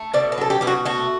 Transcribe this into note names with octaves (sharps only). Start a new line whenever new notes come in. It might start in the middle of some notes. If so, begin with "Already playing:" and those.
Already playing: A3
B2 D5
B4
F#3 A4
G4
B2 G4
F#4
A3 F#4